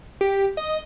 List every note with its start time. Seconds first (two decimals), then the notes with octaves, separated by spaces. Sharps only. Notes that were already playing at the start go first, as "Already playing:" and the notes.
0.21 G4
0.57 D#5